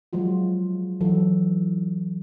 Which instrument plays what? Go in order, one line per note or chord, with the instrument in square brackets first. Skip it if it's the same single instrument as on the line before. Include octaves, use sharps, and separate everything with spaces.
[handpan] F3 F#3 G#3 F4 F#4
E3 F#3 A4